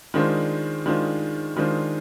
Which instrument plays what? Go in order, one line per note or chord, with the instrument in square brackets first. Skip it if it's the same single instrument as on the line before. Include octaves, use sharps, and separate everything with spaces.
[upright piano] D#3 G#3 D4 F4 C5
D#3 G#3 D4 F4 C5
D#3 G#3 D4 F4 C5